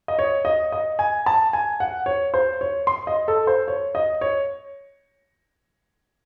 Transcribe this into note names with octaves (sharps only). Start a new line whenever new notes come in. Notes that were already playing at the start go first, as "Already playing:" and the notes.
D#5
C#5
D#5
D#5
G#5
A5
G#5
F#5
C#5
C5
C#5
C6
D#5
A4
C5
C#5
D#5
C#5